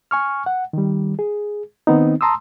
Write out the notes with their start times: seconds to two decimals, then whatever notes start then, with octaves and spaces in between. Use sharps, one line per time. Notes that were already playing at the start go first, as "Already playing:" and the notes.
0.11 G#5 C#6 F6
0.46 F#5
0.73 D#3 G3
1.19 G#4
1.87 D#3 B3 C4 D#4
2.21 A5 A#5 C6 D#6 E6